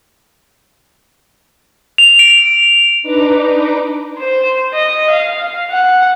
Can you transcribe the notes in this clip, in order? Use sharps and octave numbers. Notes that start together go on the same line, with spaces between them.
F7
D7
D4 D#4 B4 A#5 D6
C5
D#5
F5
F#5